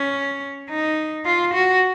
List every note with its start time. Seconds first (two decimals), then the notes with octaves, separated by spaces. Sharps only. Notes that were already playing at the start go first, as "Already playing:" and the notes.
Already playing: C#4
0.69 D#4
1.25 F4
1.54 F#4